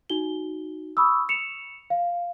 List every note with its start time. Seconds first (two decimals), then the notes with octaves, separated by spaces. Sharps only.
0.10 D#4 F#4 G7
0.97 B5 C#6 D#6 E6
1.29 C#7 E7 F7
1.90 F5